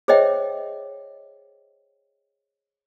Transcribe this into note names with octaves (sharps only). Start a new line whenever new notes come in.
G#4 C5 C#5 D#5 E5 G5